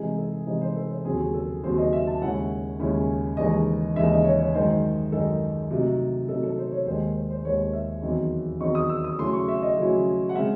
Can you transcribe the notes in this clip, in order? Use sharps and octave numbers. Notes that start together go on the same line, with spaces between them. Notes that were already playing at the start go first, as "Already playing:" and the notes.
Already playing: C3 E3 G#3 D#4 G#4
A4
C3 E3 G#3 D#4 C5
C5
A4
C5
D#2 C#3 F#3 C4 G#4
A4
D#2 C#3 F#3 C4 C5
D#5
E5
A5
D#2 C#3 G#3 C#4 E4 F#5
D#2 C#3 G#3 C#4 E4
D#2 C#3 E3 G#3 D#4 D#5
D#2 C#3 E3 G#3 D#4 E5
D#5
C#5
C#5
F#2 D#3 G#3 D#4 C5
F#2 D#3 G#3 D#4 A4
C3 F#3 A3 D#4
C3 F#3 A3 D#4 A4
A4
C5
C#5
D#2 D#3 G#3 C5
C5
C5
D#2 D#3 G#3 C#5
E5
E2 D#3 F#3 C4 D#4
E2 D#3 F#3 C4 D#4 C#6
D#6
E6
D#6
C#3 F#3 A3 C#4 E4 C6
C#6
E5
D#5
C#3 F#3 A3 C#4 E4
F#5
C#3 G#3 C4 E5